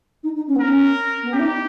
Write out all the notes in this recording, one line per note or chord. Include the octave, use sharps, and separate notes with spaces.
D#4
D#4
C#4
B3
C#4 A#4
B3
C#4 G4
E4
D#4